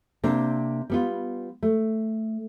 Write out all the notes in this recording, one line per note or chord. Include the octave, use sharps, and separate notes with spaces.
C3 A#3 C4 D4
G3 B3 F4
A3